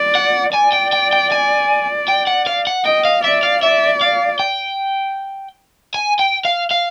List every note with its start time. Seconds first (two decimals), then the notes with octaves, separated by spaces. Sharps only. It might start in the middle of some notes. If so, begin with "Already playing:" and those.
Already playing: D5
0.15 F#5
0.54 D5 G#5
0.73 G5
0.93 G5
1.13 G5
1.32 G#5
2.09 G5
2.28 F#5
2.47 F5
2.67 F#5
2.85 D#5 G5
3.05 F5
3.24 D5 E5
3.43 F5
3.63 D5 E5
4.01 F5
4.40 G5
5.94 G#5
6.20 G5
6.45 F5
6.71 F5